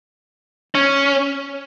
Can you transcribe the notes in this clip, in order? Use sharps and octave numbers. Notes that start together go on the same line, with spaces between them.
C#4